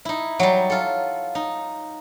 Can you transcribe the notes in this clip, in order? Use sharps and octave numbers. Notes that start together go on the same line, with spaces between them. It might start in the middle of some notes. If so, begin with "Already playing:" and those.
D#4 E4
F#3 G3
F4 A4
D#4